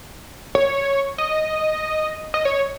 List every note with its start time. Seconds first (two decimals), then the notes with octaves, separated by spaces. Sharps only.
0.55 C#5
1.18 D#5
2.34 D#5
2.45 C#5